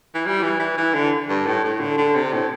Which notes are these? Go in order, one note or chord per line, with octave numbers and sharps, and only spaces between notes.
E3
G3
E3
E3
E3
D3
G2
A2
A2
D3
D3
C3
A2